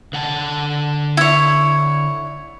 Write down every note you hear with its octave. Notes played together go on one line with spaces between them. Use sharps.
D3 F#5 A5
E4 C#5